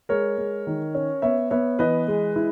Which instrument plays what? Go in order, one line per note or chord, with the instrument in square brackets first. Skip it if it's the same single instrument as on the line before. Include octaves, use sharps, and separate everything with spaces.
[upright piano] G#3 [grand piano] A#4 C#5
[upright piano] G#3
D#3
C#4
[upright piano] B3 [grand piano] C#5 E5
[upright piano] B3 [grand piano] C#5 E5
[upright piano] E3 [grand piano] B4 D#5
[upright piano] G#3
E4